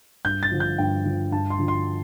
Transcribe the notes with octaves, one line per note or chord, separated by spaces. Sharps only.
G2 G6
A6
D3 F3
G6
G2 G5
D3 F3
G2 A5
C6
D3 F3
C6